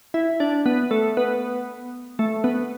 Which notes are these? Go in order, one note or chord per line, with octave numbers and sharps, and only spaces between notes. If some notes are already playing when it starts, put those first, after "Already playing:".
E4
D4
B3
A3
B3
A3
B3